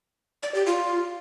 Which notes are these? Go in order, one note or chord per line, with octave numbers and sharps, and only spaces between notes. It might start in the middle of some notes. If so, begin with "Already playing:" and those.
D5
G4
F4